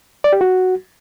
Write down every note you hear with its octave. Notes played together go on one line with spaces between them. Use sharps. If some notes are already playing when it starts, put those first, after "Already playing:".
D5
G4
F#4